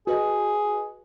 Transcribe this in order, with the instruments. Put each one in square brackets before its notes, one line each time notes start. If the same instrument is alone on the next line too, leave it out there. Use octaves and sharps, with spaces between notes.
[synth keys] F#4 B4 D#5 [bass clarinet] G#4